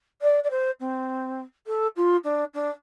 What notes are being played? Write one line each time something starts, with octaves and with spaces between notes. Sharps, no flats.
D5
D5
C5
C4
A4
F4
D4
D4